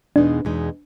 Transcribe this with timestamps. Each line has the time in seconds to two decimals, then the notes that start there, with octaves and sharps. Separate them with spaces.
0.16 E2 B2 G#3 B3 D4 D#4
0.45 E2 B2 G#3 B3 D#4